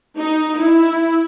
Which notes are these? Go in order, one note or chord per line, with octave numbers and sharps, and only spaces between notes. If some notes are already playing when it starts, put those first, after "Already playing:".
D#4
E4